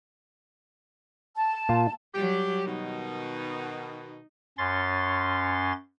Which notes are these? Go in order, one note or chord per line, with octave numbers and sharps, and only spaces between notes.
A5
A#2 F4
F#3 G3 G4
B2 D#3 D#4
F#2 C#4 C6 A6